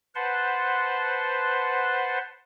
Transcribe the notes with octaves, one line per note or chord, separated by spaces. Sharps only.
B4 C5 F#5 A5 C6